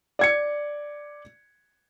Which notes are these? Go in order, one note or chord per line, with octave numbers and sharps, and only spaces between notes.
D5 G#6 C#7